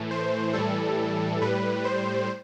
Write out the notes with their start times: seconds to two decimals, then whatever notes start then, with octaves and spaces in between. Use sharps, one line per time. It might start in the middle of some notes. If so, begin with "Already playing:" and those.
Already playing: A2 E3 A3
0.11 C5
0.53 A2 E3 G3 A4
1.42 A2 G3 B4
1.85 C5